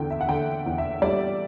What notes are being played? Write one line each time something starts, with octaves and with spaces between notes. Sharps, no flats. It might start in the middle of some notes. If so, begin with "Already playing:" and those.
Already playing: E2 D3 G5
E5
F#5
D3 G5
E2
E5
G3 D5